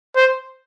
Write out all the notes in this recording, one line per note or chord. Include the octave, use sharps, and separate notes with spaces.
C5